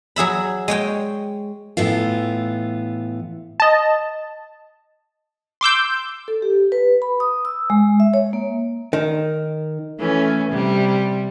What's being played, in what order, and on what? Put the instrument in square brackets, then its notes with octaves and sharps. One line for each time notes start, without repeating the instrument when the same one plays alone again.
[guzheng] F#3 G#4 E5 B5
G#3 C#5 G5
[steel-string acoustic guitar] A2 E3 B3 F4
[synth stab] D#5 A5
C6 D6 E6 G6
[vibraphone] A4
G4
B4
B5
D#6
E6
G#3
E5
C#5
A#3
[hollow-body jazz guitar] D#3
[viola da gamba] E3 A3 C#4
C3 G3